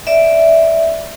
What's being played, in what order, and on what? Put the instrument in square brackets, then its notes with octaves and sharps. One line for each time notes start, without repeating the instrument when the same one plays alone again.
[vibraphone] D5 E5